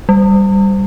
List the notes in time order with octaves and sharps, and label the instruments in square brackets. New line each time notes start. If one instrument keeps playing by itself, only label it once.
[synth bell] G3